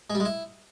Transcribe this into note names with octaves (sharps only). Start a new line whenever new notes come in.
G#3
G3
G#3
E4